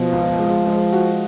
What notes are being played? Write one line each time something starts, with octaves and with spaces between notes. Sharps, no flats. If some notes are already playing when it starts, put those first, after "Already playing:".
Already playing: B2 F3
C#2
G#3
G#3
F#4